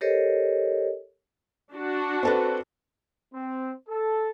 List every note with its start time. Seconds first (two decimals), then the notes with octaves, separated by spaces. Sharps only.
0.01 G4 A4 A#4 C5 C#5 D#5
1.73 D4 F#4
2.23 C4 A4 B4
3.34 C4
3.89 A4